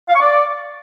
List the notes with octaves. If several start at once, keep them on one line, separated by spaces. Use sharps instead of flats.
F5
C#6
D5